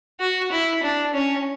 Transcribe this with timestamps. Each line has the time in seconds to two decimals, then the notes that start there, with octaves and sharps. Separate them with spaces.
0.20 F#4
0.52 E4
0.83 D4
1.14 C#4